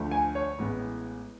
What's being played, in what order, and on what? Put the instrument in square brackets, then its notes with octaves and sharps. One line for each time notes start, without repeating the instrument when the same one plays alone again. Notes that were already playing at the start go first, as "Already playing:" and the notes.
Already playing: [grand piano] D2 D3 F3 A3
G#5
C#5
A1 A2 G#3 B3